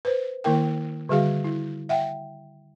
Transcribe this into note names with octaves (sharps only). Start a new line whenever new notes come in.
B4 C5
D#3 A#3 E4 A#4 G5
D3 G3 F#4 G#4 F5
E4
E5 F#5 G5